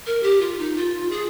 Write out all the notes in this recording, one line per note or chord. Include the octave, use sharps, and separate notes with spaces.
A#4
G4
F4
D#4
F4
G#4